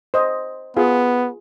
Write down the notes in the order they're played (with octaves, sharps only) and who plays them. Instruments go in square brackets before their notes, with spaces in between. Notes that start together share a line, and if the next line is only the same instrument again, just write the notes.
[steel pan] C5 D#5
[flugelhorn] B3 [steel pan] F4 G#4